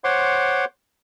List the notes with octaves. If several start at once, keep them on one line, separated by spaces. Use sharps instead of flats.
C5 C#5 F#5 C6 D6